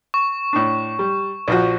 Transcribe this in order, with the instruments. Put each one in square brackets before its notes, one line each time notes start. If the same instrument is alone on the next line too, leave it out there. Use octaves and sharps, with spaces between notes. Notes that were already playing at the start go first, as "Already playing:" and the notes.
[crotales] C#6
[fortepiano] A2 D4
G3
A#1 F3 F#4